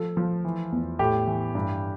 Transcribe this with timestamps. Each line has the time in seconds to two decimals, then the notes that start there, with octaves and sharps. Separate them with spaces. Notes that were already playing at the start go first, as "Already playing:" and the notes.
Already playing: F3 A4
0.17 F3
0.45 E3
0.72 E2
0.99 A2 G4
1.27 E3
1.55 G2